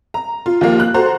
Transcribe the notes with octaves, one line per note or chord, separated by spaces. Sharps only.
A#5
F4
D#2 F3 A#3
F#6
F#4 A4 C5 A#5 C6